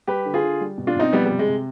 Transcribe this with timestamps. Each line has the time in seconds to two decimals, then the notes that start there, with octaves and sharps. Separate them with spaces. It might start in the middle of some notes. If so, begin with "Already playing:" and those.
0.07 G3 G4 B4
0.26 D3
0.34 F4 G#4
0.43 D3
0.61 G3
0.78 B2
0.87 D4 F4
0.95 B2 C4 D#4
1.13 F3 G3 B3
1.26 C3 G3
1.39 G#3
1.48 C3